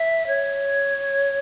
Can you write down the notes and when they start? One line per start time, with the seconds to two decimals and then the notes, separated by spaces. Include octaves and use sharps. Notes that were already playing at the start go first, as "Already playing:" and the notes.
Already playing: E5
0.27 C#5